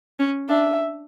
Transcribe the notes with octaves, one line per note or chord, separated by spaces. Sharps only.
C#4
D4 E5